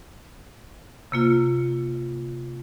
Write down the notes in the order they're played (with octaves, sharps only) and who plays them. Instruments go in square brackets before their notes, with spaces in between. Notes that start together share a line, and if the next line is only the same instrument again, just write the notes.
[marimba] C3 A#3 F4